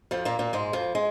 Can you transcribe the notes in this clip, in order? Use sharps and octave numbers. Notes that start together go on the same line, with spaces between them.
F2 F3
A#2 A#3
A#2 A#3
G#2 G#3
F2 F3
G#3